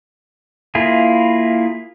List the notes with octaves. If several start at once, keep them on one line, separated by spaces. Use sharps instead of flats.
A#3 E4 F4 G#4